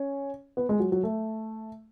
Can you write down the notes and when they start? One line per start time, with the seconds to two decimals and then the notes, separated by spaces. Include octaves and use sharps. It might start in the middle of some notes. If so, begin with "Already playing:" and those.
Already playing: C#4
0.57 B3
0.69 G#3
0.80 F#3
0.92 F#3
1.03 A3